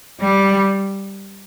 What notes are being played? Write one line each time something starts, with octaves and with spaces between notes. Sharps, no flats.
G3